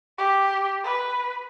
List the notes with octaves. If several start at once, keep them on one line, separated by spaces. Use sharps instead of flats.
G4
B4